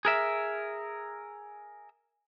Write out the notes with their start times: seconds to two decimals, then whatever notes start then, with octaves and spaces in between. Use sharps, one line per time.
0.05 G#4 A#4 E5